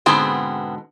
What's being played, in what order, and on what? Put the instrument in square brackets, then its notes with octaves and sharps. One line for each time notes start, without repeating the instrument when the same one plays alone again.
[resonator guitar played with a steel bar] G#2 B2 D3 [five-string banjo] B3 C4 G#4